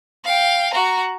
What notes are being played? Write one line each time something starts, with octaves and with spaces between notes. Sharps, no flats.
F5 G5
F#4 A#5